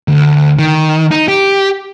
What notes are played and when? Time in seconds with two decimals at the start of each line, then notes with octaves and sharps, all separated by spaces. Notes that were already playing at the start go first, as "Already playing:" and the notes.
0.08 D2
0.59 D#3
1.11 D#4
1.28 G4